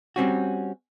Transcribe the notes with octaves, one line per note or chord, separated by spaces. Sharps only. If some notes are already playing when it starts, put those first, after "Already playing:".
G3 C4 C#4 F#4